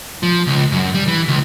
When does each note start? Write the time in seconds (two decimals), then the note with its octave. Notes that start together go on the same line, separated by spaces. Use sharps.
0.23 F3
0.47 C#2
0.72 F#2
0.94 G3
1.08 E3
1.28 C#2